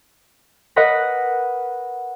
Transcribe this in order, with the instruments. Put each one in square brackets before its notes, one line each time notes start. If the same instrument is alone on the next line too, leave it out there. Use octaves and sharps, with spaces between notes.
[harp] A#4 B4 D#5 F#5 B5 A#6